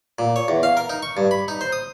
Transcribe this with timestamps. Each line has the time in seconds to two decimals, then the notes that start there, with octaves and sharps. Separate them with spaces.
0.19 A#2
0.36 C#5
0.48 E2
0.63 F5
0.77 A#4
0.90 D#4
1.03 C#6
1.17 G2
1.31 B5
1.48 D#4
1.61 C5
1.72 D#6